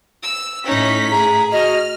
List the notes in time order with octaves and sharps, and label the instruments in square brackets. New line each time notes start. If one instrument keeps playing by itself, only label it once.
[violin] E6
[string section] A2 B6 [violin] C#4 D#4
[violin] G#4 [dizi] A#5
[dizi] F#4 [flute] D#5 [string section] F6